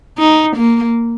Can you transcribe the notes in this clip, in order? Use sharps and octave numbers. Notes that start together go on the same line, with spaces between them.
D#4
A#3